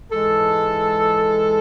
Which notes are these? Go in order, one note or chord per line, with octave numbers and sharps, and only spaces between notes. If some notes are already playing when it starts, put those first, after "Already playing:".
G#2 E3 G#3 A4